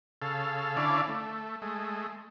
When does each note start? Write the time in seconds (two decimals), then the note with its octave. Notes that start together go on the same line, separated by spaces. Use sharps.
0.22 C#3 A4 F5
0.77 D3 C#4 E4 D5 F5 A5
1.08 A3
1.62 G#3 A3